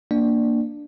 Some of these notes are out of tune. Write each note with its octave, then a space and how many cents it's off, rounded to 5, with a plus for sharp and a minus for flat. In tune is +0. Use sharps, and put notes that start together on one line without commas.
A#3 +0 D4 +0 D5 +15